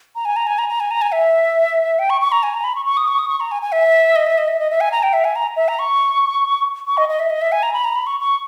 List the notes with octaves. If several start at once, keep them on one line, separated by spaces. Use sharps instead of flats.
A#5
G#5
A#5
G#5
A#5
A#5
G#5
A#5
G#5
E5
G5
C#6
C#6
A#5
G#5
A#5
B5
C#6
C#6
D#6
C#6
D#6
C#6
A#5
G#5
G#5
E5
D#5
E5
D#5
E5
D#5
E5
G#5
A#5
G5
E5
G#5
A#5
E5
A#5
C#6
C#6
D#5
D#5
E5
D#5
E5
G#5
A#5
B5
A#5
B5
C#6
C#6